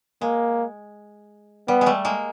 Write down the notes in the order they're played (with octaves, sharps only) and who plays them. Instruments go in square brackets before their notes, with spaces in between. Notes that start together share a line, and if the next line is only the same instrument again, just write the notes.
[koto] G#3 [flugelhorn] A#3
[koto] G3 [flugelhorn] B3
[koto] G#3
G3 A3
G#3 A#3